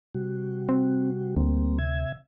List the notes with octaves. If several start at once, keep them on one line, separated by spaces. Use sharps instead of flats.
C3 G3 F#4
C4
D2 G3 A#3 C4
C3 E5 G#6